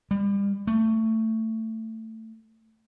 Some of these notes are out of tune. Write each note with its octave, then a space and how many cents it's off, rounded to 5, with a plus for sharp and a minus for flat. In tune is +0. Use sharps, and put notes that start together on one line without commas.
G3 +35
A3 +20